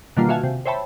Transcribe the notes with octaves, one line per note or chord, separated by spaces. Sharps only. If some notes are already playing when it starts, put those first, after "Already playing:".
B2 D3 D#3 G3 A#3 F4
F#4 E5 F5 G#5 A5
C3
C5 C#5 E5 G5 A5 B5